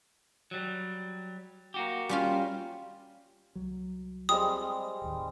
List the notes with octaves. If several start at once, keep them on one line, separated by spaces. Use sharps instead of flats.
F#3 G3
A#3 F#4 G4
G3 C#4 F4
C2 F#3
G3 G#3 C4 D#6
D1 D#2